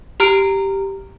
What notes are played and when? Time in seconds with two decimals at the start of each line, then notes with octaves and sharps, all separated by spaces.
0.20 G4 A#5 F6 D7